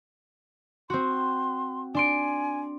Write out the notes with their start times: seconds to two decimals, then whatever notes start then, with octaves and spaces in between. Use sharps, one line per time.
0.90 C4 F#4 C6
1.95 D4 G#5 C6 D7